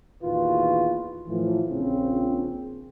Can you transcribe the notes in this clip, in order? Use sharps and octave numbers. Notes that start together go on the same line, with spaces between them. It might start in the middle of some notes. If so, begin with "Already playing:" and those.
E2 A#2 D#3 F4 F#4 B4
A2 E3 F3
A#1 C#3 C4